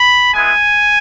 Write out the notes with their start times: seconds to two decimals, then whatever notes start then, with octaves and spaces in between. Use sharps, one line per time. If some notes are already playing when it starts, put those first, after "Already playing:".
Already playing: B5
0.34 G#3 B3 E4 G#5